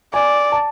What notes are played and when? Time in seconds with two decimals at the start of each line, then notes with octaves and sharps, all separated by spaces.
0.14 D5 G#5
0.52 A5